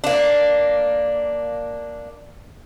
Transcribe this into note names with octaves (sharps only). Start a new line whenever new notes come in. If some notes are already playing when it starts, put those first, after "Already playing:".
A#3 D4